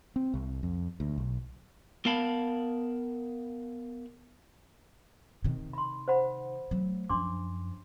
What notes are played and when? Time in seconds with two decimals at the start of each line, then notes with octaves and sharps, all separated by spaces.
0.16 C4
0.34 C2
0.63 F2
1.00 D2
1.18 B1
2.06 B3 A#4 F5 A5 B5
5.44 C3 D#3
5.73 B5 C6
6.08 C5 F#5 B5
6.71 F#3 A3
7.09 F#2 F3 D4 C6 D6